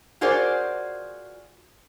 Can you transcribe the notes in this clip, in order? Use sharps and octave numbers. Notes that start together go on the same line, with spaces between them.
F4 F#4 G#4 A#4 C5 D5